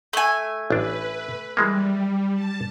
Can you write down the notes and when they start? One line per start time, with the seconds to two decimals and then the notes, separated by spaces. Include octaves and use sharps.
0.13 A3 G#5
0.70 A1 D4 B4
1.57 E3 G3 G#3 A#3
2.33 A5